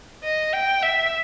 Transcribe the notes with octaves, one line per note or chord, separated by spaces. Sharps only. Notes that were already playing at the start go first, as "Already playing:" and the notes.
D#5
G5
E5